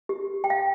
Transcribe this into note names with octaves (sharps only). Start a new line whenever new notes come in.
G4
G5
F5